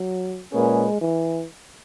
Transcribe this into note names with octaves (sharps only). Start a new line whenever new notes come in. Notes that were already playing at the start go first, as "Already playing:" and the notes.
Already playing: F#3
A#2 G#3 A#3 C#4 G#4 B4
E3